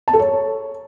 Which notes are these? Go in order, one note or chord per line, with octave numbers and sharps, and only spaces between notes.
A5
A4
C#5